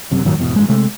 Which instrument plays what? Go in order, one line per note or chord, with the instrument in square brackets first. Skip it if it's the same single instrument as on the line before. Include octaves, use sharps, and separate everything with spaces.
[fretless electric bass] F#1 F#2 C3
F#2 A2 D#3 F#3
G#1 E2 B2
A1 G2 G#3
C3 G#3 A3